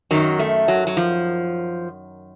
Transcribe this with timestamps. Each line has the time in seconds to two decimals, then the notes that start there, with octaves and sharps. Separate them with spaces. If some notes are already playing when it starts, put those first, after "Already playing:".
0.11 F#2 D#3 F#3
0.39 A3
0.68 F#3
0.87 F#3
0.97 F3